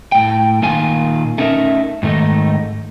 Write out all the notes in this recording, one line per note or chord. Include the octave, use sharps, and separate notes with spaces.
A2 G5
A#2 D#3 F4 G#5
A3 C#4 D#4 A#4 E5
G#2 D#3 A3 D#4